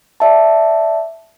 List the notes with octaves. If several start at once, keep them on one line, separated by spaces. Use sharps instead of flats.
D5 E5 A5